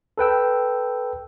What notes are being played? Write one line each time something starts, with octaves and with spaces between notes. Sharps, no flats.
A4 B4 G5 E6